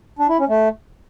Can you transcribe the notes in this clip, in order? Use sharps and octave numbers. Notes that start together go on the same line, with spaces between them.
D4
E4
C#4
A3